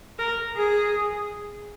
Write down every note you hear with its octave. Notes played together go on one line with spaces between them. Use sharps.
A#4
G#4